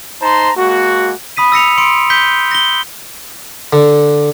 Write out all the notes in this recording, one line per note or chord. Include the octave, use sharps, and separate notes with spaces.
D#4 C5 A5 A#5 C6
G#3 A#3 F#4
B5 D#6 B6 D#7
E6 A#6 C#7 F7
C6 C#7 D7
G6 B6 G7
A#6 G7
D3